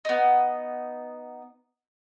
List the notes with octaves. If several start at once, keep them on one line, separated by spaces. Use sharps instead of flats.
B3 D#4